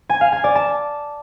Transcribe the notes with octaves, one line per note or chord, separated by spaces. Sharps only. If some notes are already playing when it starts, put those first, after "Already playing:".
G#5
F5
G#5
D5
A5